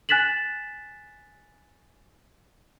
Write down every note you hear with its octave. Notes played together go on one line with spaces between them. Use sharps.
G#5 F#6 A6 B6 E7 F#7